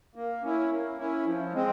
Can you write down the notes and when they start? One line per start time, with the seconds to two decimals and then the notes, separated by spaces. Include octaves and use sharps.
0.15 A#3
0.43 C#4 E4
0.70 A#3
0.98 C#4 E4
1.26 F3
1.53 G#3 C4